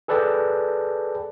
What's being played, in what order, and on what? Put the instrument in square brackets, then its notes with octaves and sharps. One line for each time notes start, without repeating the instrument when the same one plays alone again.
[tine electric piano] G#4 A4 B4 D5 G5 A5